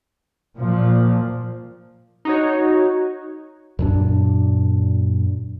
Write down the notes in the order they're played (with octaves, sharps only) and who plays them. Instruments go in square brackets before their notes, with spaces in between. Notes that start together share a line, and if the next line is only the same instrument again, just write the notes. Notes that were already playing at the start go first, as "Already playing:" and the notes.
[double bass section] A#2 F3
[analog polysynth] D#4 F#4 C#5
[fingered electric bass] F#2 A#2 D4